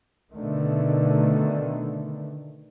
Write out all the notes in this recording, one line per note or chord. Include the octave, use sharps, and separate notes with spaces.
B2 D3 D#3 A3